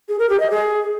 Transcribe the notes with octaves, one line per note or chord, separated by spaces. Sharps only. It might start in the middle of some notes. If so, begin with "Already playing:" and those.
G#4
A#4
G4
D#5
G#4